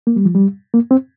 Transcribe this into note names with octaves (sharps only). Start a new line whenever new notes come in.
A#3
G3
F3
G3
A#3
C4